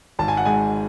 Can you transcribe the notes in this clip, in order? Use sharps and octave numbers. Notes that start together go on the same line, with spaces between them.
G#1 A5
G#5
F#5
G#2 G#5